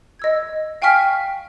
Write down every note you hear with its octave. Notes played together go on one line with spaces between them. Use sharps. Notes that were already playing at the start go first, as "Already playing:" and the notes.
D#5 E6 G#6
F5 G5 G#5 C#6 F6 B6